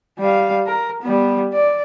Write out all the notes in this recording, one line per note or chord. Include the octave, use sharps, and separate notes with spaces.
G3 F5
A#4
G3 B3
D5